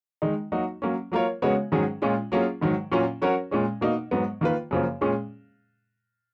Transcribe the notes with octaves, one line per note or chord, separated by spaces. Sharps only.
D#3 G#3 D#4
F#3 A#3 D#4 F#4
F#3 A#3 C#4
F#3 A#3 F4 A#4 C#5
C#3 G#3 B3 F#4 C#5
G#2 D#3 F#3 C#4 G#4
A#2 G#3 C#4 F4
F#3 A#3 C#4 F4 G#4
G#2 D#3 F#3
A#2 F#3 A#3 C#4 F4
F#3 C#4 F#4 A#4 C#5
A#2 G#3 C#4
B2 A#3 D#4
G#2 F#3 B3
D#3 A#3 F4 B4
F#2 C#3 F3 A#3
A#2 G#3 C#4 G#4